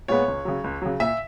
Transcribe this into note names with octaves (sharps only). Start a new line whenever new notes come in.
A#2 G#3 B3 C#5
C#2
C#3 F#3
C#2
C#3 F#3
A#2 E5